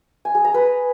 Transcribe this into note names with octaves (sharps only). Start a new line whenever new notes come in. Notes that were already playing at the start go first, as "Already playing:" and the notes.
G#5
G#4
A#5
B4